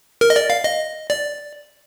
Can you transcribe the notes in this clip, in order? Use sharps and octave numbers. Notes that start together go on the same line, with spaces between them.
A#4
D#5
D5
F5
D#5
D5